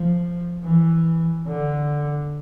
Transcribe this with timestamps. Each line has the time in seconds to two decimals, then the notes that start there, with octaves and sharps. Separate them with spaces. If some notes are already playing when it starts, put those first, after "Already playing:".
Already playing: F3
0.64 E3
1.47 D3